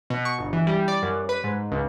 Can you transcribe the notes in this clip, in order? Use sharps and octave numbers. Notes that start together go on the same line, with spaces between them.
B2
C#6
G1
E3
G3
D5
F#2
B4
G#2
C#2